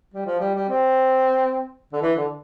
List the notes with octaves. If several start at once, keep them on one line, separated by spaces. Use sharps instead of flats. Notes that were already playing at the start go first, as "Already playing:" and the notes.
G3
F3
G3
G3
C4
D3
E3
D3